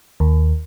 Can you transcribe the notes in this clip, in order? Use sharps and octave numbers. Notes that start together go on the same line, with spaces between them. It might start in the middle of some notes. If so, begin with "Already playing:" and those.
D#2